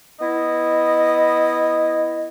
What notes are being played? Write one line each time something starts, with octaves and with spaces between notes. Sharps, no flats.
B3 E4 D#5